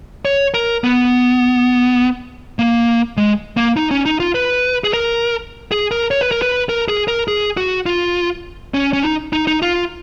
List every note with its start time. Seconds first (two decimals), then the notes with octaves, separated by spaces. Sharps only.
0.25 C#5
0.54 A#4
0.84 B3
2.59 A#3
3.17 G#3
3.57 A#3
3.77 D#4
3.91 C#4
4.05 D#4
4.20 F4
4.35 B4
4.84 G#4
4.93 A#4
5.72 G#4
5.91 A#4
6.11 C#5
6.21 B4
6.31 A#4
6.42 B4
6.69 A#4
6.88 G#4
7.08 A#4
7.28 G#4
7.57 F#4
7.86 F4
8.74 C#4
8.93 C#4
9.03 D#4
9.33 D#4
9.47 D#4
9.62 F4